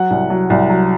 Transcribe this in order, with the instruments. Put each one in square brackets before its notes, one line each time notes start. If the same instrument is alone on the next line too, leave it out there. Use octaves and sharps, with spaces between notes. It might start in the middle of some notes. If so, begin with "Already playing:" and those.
Already playing: [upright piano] F#3 F#5
C2
F#3
C2
F#3